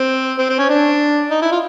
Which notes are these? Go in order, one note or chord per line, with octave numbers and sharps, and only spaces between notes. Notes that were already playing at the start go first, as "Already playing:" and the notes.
Already playing: C4
C4
C4
C#4
D4
D#4
E4
F4